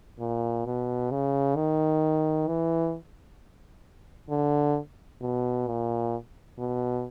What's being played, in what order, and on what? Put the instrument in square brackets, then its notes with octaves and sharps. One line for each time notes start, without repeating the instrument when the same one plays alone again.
[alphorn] A#2
B2
C#3
D#3
E3
D3
B2
A#2
B2